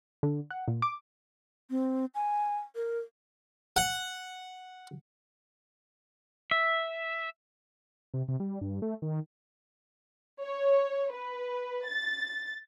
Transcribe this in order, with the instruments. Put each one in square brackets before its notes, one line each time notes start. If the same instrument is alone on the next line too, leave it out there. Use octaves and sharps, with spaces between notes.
[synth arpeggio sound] D3
F#5
A#2
D6
[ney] C4
G#5
A#4
[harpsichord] F#5
[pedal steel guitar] E5
[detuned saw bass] C3
C3
G3
G2
A3
D#3
[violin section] C#5
B4
A6